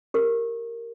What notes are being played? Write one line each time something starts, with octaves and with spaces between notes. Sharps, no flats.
G4 A#4